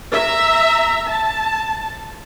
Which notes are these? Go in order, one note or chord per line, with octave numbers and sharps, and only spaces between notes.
E5 A#5
A5